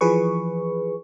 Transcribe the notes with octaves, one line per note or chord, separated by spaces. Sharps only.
E3 F3 G#4 B4 C#6